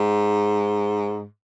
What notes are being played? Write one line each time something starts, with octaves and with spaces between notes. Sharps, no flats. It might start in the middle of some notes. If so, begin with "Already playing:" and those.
Already playing: G#2